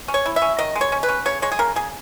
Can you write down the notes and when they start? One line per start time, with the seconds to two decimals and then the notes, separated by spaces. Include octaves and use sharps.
0.08 C#4
0.14 C#5
0.26 E4
0.36 E5
0.42 C#4
0.59 D#3 D#5
0.76 G#3
0.81 C#5
0.92 C#4
1.03 B4
1.09 C#4
1.26 C#3 C#5
1.42 G#3 C#5
1.52 G#4
1.59 C#3 A#4
1.76 C#3 G#4